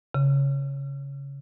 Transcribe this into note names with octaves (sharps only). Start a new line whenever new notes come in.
C#3